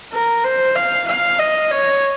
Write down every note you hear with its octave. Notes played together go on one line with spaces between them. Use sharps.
A#4
C5
F5
F5
D#5
C#5